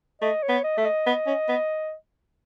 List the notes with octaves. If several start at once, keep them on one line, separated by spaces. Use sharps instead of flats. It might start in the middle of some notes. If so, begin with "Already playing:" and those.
A3 D#5
C#5
B3
D#5
A3 E5
D#5
B3
C#4
B3